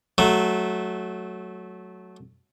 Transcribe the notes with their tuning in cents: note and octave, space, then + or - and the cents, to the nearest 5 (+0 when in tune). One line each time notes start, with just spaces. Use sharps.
F#3 +0 A3 -15